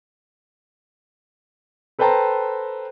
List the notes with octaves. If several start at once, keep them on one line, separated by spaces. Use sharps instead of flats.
A4 B4 C5 G5 A5 A#5